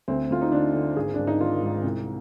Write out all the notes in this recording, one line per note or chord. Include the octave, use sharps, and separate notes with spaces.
D2 C4
D2 F4
D#4
D3 D4
D3
G#1 G#4
G#1 D4
D#4
D#3 F4
G#2
C2